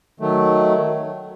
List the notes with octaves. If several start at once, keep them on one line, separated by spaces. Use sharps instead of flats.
D#3 F#3 A3